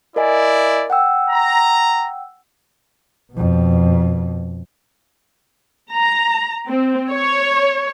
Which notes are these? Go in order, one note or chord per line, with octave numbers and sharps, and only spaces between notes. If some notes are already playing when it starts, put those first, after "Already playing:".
E4 A#4 D5 D#5 G#5
F#5 G5 E6
A#5
F2 B2
A#5
C4
C#5